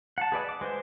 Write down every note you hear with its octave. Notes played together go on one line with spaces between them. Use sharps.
F#5 A5
G#4 B4 D5 D#5
D6
G#3 B4 C5